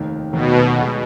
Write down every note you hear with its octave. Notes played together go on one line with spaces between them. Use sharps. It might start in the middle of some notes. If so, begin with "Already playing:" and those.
Already playing: F1 D#2 D#3
F1 D#2 B2 D#3
B1 B2 G#3